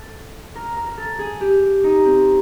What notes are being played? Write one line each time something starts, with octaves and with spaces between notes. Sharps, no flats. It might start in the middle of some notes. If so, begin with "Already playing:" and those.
Already playing: A4
A#4
A#4
A#4
A4
G#4
G4
D#4
C4